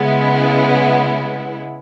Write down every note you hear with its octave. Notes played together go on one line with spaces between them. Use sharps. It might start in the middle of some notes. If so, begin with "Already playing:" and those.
Already playing: C#3 G#3 B3 E4